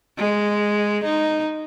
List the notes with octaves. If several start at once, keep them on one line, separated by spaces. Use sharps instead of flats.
G#3
D#4